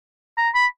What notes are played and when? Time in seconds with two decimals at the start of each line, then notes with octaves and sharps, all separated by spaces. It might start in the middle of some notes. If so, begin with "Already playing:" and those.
0.38 A#5
0.55 B5